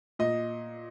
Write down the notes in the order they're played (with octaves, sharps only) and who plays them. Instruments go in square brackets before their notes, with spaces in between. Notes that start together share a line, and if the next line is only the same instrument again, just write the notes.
[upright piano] A#2 D#5